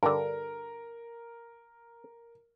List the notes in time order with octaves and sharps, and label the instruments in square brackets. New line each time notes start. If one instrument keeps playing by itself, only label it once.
[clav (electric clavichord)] G2 D3 [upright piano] A#4